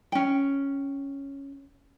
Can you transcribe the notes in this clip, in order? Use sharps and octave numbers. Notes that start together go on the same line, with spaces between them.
C#4 G5